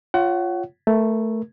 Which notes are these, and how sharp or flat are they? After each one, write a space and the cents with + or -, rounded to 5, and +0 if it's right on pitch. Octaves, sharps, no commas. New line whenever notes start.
F4 +0 C#5 +0 F#5 +30
A3 +0 A#4 +20